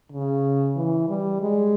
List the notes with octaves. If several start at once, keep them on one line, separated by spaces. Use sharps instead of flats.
C#3
E3
G3
G#3